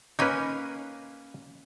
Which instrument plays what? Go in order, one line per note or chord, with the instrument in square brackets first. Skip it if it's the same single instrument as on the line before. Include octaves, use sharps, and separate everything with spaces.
[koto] A#3 C#4 [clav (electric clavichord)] D#4 B4